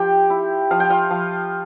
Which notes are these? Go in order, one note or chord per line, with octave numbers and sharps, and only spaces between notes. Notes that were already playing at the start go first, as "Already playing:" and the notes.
Already playing: F3 G4 G5
E4
F3 F5
G5
F4 F5
F3